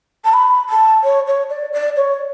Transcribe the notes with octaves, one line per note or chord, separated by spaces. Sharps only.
A5
B5
A5
C#5
C#5
D5
D5
C#5